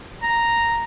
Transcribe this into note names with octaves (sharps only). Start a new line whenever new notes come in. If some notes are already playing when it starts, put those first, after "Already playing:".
A#5